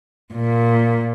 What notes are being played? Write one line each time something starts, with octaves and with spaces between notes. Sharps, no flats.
A#2